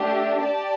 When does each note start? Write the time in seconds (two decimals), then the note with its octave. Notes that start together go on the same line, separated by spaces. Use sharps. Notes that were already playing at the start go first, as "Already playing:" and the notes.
Already playing: A3 D4 G4
0.43 G4 D5 A5